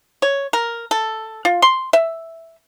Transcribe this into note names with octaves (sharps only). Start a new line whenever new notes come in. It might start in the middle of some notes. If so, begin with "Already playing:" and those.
C#5
A#4
A4
F4
C6
E5